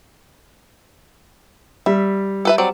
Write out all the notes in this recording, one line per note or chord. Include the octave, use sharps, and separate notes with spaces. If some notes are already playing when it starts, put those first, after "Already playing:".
G3 E5
A4 B4 E5
F#3 C4 D5